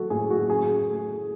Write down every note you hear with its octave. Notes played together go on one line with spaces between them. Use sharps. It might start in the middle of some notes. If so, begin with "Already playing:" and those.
Already playing: F#3 G#3 F#4 A4
A2 G#4
F#4
F#2 G#4
A3